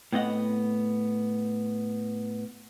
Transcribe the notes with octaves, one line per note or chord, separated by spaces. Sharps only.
A2 B3 C4 D#5 F#5